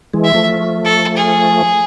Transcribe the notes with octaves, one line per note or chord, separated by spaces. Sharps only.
E3 G#3
E5
F3 A3
A4
G#4